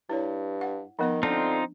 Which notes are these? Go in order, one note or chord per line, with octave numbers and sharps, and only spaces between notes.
G2 E4 C#5
F#5
D#3 F3 B3 D#5
D3 C4 D4 D#4 F4